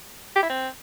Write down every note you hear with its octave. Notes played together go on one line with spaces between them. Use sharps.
G4
E4
C4